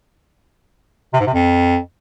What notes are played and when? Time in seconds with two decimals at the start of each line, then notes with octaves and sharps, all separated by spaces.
1.14 C3
1.20 G#2
1.27 C3
1.34 F2